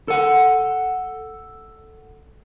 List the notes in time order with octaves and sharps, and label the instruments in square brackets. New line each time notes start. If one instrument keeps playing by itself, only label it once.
[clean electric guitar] A4 F#5